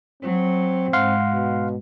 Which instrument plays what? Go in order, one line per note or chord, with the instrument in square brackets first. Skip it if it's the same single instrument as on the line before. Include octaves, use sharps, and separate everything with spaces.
[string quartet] F#3 [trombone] C4
[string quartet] G#2 [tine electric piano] F5 F#5 C6
[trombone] B2